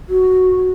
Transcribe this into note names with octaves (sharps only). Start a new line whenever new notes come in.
F#4